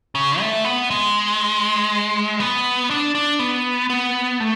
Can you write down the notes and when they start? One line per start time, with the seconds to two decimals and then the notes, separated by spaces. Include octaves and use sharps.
0.15 C#3
0.40 A3
0.65 B3
0.90 G#3
2.40 B3
2.91 D4
3.15 D4
3.39 B3
3.90 B3
4.40 A3